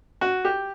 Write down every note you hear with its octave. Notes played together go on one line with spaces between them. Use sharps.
F#4
G4